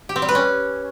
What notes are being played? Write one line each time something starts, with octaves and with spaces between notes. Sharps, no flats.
G4
C4
G3
B4
C#4